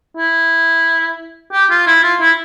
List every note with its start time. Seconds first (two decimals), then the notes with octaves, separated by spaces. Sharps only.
0.17 E4
1.52 G4
1.70 F4
1.87 E4
2.03 F4
2.20 E4